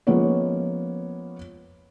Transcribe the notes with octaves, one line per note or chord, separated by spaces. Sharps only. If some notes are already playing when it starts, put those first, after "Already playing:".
F3 G#3 A#3 B3 C#4 C#5